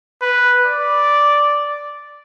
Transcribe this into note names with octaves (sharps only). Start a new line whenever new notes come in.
B4
D5